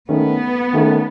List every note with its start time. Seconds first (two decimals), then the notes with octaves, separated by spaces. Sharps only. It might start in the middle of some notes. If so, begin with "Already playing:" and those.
0.09 D#3 A3 B3 C#4
0.73 D#3 A3 C#4